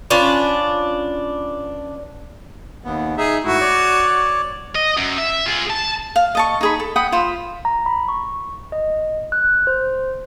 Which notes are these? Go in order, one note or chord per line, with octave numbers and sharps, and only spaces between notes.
C#4 D4 F4 B4
D#2 B3
D#4 G#4 E5
G#2 A3 E4 F#4
C#5 D5
D#5
F#2
E5
F4 G#4
A5
F5
D#5 A5 C#6
D#4 G#4 B5
A4
F#5 G5 B5 D#6
F4 C5 B5
A#5
B5
C#6
D#5
F#6
C5